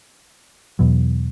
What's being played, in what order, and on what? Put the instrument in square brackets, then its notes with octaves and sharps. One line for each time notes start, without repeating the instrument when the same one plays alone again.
[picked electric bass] E2 B2 F#3